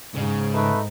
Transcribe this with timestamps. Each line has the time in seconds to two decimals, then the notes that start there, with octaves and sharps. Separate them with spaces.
0.15 G#2 C#3
0.54 A3 D#4 B4